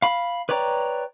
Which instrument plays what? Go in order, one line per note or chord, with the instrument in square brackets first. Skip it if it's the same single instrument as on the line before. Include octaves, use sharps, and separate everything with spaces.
[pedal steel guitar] F5 B5
B4 C#5 D5 G5 A#5